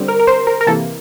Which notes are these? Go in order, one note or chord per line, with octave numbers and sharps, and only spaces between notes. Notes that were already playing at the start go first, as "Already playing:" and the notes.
Already playing: D3 G3 C4
A#4
A#4
C5
A#4
A#4
C3 E3 A#3 A4